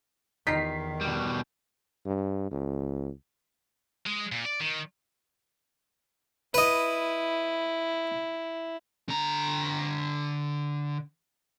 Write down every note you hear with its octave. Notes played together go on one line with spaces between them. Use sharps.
E2 D#3 D#4 F4 G4 B6 C7
B2 G3
G2
C#2
G#3
A#2
D5
D#3
E4 B4 D#5
D3 A#5